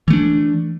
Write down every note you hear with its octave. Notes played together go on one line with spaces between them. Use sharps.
E3 A3 D4